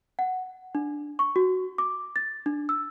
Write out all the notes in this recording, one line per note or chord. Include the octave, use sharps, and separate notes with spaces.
F#5
D4
C#6
F#4
D6
A6
D4
E6